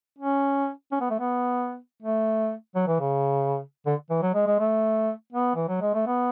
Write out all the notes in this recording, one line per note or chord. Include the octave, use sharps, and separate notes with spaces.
C#4
C#4
B3
A3
B3
A3
F#3
E3
C#3
D3
E3
F#3
G#3
G#3
A3
B3
E3
F#3
G#3
A3
B3